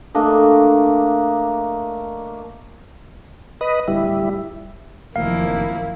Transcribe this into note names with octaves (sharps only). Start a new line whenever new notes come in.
A3 A#3 D4 D#5
B4 D#5
D1 G3 E4
F1 F#2 D#3 F3 A#3 E4 F5